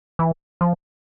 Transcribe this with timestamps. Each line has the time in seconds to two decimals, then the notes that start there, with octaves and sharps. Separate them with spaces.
0.19 E3
0.61 F3